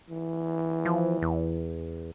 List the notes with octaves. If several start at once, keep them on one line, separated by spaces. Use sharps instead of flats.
E3
F3
E2